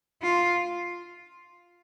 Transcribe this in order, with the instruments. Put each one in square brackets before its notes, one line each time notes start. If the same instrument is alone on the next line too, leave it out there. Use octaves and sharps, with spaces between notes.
[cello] F4